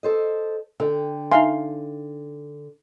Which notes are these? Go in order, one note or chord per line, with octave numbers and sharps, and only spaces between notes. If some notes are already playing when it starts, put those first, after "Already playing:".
A4 C5 D#5
D3 A4 G5
D#4 E5 F5 G#5 C6